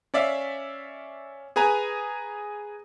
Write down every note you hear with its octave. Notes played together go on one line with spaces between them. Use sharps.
C#4 D5 E5 F5
G#4 B4 G#5 A#5